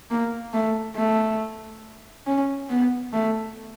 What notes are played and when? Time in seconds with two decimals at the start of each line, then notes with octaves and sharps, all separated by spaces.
0.11 A#3
0.53 A3
0.97 A3
2.27 C#4
2.70 B3
3.13 A3